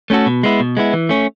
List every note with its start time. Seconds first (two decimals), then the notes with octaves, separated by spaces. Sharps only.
0.10 A3 C#4 F#4 A4
0.26 B2
0.43 G#3 B3 E4
0.60 B2
0.77 G#3 B3 E4
0.93 E3
1.09 A3 C#4